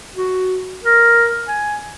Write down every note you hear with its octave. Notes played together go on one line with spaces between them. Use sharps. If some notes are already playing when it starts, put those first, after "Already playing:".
F#4
A#4
G#5